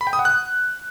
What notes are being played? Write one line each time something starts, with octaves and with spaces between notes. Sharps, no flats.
B5
G5
D#6
F#5
F#6